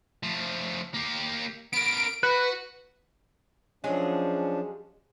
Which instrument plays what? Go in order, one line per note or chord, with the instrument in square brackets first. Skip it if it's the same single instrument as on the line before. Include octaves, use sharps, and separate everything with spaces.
[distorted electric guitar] F3 A3
A#3 G4
[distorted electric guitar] B3 A#4 [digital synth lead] D7
[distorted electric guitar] F#4 [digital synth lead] B4
[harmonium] F3 C#4 D4 [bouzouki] F#3 G#3 G#4